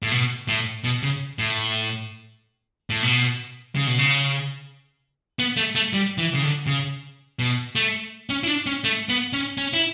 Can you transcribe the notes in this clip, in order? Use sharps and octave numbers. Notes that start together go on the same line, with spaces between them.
A2
B2
A2
B2
C#3
A2
A2
B2
C#3
B2
C#3
B3
A3
A3
G3
E3
C#3
D3
C#3
B2
A3
C#4
E4
D4
C#4
A3
B3
C#4
C#4
E4